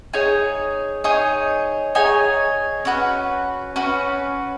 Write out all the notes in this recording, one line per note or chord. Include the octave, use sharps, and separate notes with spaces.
D#4 G#4 C#5 G#5
D#4 G#4 C#5 G#5
D#4 G#4 C#5 G#5
C#4 F#4 B4
C#4 F#4 B4